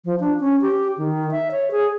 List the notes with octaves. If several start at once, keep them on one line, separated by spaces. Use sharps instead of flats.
F3
D4
C#4
G4
D#3
E5
C#5
G#4